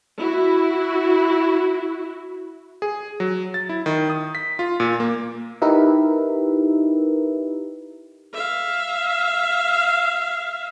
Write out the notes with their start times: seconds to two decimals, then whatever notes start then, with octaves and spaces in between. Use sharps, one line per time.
0.19 E4 F#4
2.82 G#4
3.20 F#3
3.54 A6
3.69 E4
3.86 D#3
4.10 D#6
4.35 B6
4.59 F4
4.80 A#2
5.00 A#3
5.62 D#4 E4 G4 A#4 B4 E5
8.34 E5 F5